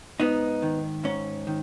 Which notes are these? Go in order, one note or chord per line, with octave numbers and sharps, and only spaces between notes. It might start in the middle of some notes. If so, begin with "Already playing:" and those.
G#2 B3 D#4
D#3
G#2 C#4
D#3